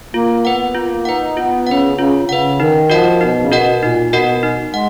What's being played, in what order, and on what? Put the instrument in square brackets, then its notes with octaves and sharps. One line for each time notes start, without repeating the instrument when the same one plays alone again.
[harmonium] A#3 [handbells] F4
[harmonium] B3 [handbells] B4 F#5
[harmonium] A#3 [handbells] F4
[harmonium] D#4 [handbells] B4 F#5
[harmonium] B3 [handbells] F4
[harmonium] C#3 [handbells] B4 F#5
[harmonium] C#3 [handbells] F4
[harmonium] C#3 [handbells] B4 F#5
[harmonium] D#3 [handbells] D#4
[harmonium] F3 [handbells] F#4 A#4 D#5 F#5
[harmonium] B2 [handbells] D#4
[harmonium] C#3
[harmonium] B2 [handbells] F#4 A#4 D#5 F#5
[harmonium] A#2 [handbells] D#4
[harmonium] B2 [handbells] F#4 A#4 D#5 F#5
[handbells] D#4
[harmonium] G#3 [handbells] F#5